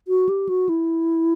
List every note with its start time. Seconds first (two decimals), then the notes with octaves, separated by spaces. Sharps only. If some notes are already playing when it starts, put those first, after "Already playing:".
0.08 F#4
0.29 G4
0.49 F#4
0.69 E4